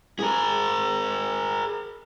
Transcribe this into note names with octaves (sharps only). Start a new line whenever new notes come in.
G#4 A#4